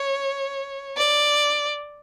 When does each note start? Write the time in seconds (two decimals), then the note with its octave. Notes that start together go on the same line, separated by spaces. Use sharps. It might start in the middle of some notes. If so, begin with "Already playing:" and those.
Already playing: C#5
0.97 D5